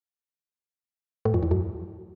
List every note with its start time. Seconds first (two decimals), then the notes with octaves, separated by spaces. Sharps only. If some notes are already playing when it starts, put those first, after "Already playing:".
1.25 A2
1.34 F2
1.43 E2
1.51 F#2